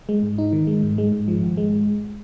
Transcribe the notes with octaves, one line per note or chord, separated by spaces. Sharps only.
G#3
G#2
D#4
D#3
G#3
G#2
G#3
G#2
F3
G#1
G#3